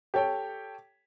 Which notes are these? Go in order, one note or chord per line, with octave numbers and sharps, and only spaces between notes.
G4 A4 C#5 G5